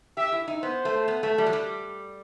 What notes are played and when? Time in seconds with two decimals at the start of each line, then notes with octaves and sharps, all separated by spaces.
0.17 G4 E5
0.32 E4
0.48 D#4
0.63 B3 C5
0.85 A3
1.08 B3
1.23 A3
1.38 G3
1.46 F#3
1.53 G3